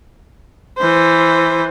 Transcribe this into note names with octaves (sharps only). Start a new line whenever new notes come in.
E3 C5